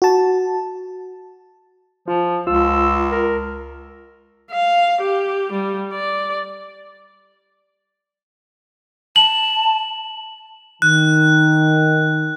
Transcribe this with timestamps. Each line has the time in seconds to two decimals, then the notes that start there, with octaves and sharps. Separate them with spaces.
0.02 F#4 A5
2.08 F3 F4
2.47 C#2 F4 E6
3.12 A#4
4.51 F5
5.02 G4
5.53 G3
5.92 D5
9.16 A5 F#7
10.82 D#3 F#6